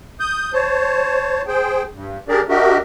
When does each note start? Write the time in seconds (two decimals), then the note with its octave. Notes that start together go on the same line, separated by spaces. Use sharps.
0.20 D#6 G6
0.53 C5 C#5 A5
1.47 G#4 C5 G5
1.93 G2
2.28 D4 G4 G#4 A#4 D5
2.49 D4 F#4 G4 A#4 D#5 E5